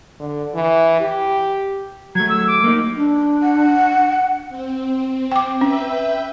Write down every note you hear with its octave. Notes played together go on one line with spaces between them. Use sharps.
D3
E3
G4
F#3 A3 G#6
E6
D6
A#3 B3 D#4
D4
F#5
C4
G5 D6
C#4 B4 E5 G5